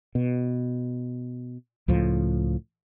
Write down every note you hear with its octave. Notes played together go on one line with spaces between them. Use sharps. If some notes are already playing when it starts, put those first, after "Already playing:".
B2
C#2 A2 F3